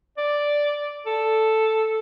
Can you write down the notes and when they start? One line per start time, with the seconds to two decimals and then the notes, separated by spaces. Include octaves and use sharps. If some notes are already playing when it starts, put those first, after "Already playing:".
0.18 D5
1.06 A4